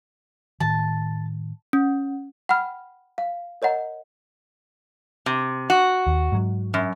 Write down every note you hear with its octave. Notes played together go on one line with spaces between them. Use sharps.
A2 D#3 A5
C#4
F#5 G5 B5 F6
F5
A#4 C#5 D#5 F#5 A#5
C3
F#4
D#2
G#2 F#3
F#2